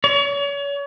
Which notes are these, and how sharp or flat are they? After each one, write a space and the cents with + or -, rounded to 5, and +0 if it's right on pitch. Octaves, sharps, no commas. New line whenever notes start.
C#5 +35